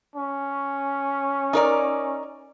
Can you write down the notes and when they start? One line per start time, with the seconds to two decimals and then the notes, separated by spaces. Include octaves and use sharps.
0.16 C#4
1.53 D#4 A#4 D5